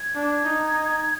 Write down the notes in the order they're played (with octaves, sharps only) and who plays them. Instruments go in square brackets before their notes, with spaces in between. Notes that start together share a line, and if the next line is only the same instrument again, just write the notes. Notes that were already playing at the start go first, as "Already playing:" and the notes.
Already playing: [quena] G#6
[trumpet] D4
D#4
D#4